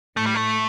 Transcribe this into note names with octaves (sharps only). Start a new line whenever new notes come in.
A2 A3
G3
A3